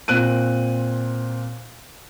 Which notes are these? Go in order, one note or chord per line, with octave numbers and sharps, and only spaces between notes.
A#2 C4 F#6 D7 D#7